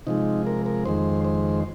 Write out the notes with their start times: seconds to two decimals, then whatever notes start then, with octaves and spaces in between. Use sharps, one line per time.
0.07 C3 F3 G#3 D#4
0.47 A#4
0.66 A#4
0.85 F2 D#3 G#3 C5
1.25 C5